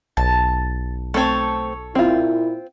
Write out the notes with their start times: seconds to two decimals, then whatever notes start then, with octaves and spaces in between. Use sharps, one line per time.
0.17 B1 A5
1.14 A3 C4 A4 C#5
1.95 A#2 C4 E4 F4